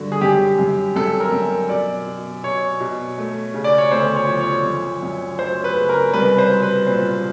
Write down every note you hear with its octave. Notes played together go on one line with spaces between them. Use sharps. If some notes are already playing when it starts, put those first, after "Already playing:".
Already playing: G2 D3 F#4
G#4
F#2 G4
F#2
F#2 A4
A#4
F#2
B2 D5
B2
B2 C#5
B2
A3
C#3
D5
C#5
D2 C5
C#5
F3
C#5
F#2
F#2
F#3 C5
B4
C#3
A#4
C2 B4
C5
F#3
B4
A#2 C5